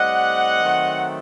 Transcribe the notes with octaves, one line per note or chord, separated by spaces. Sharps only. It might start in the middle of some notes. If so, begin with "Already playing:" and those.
Already playing: A2 G3 C4 D#5 F#5
D#3 F#3 A3 C4